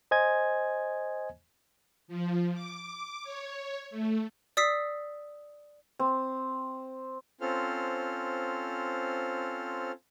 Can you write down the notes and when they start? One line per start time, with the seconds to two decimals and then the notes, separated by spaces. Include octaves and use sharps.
0.11 C5 D#5 G#5 G#6
2.08 F3
2.54 D6
3.24 C#5
3.90 A3
4.57 D5 D#6 E6 B6 C7
5.99 C4
7.41 C4 C#4 F4 A4 C5 F6